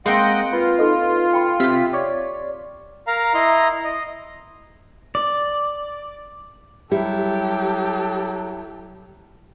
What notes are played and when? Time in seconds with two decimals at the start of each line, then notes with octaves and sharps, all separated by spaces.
0.06 G#3 A#3 C4 D#5 F#5 G5 C6
0.53 F4 B4
0.79 D#4 A4 D#5
1.33 G5 B5
1.60 C3 G4 E5 F5 B6
1.93 C#5 D5
3.07 A#4 F5 A#5
3.34 E4 D#5 A#5 C6
3.84 D#5
5.15 D5
6.91 F#3 G3 E4 G4 A4